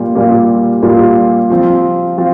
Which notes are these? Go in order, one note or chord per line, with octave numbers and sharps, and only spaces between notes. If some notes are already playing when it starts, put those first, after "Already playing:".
Already playing: A#2 G3 A#3 F4
A#2 G3 A#3 F4
A#2 G3 A#3 F4
F3 C4 F4
F3 C4 F4